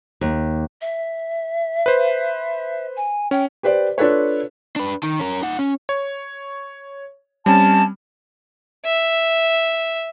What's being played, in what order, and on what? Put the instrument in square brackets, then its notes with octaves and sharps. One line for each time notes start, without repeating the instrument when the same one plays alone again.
[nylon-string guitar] D#2
[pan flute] E5
[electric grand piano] B4 C5
[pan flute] G#5
[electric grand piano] C#4 [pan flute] G5
[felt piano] G4 B4 C5 D5
D4 F4 A4 B4 C#5
[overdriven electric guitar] D4 B4
D#3
C#4 A#4
D#4 F#5
C#4
[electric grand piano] C#5
[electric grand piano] G3 C4 C#4 [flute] A5
[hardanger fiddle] E5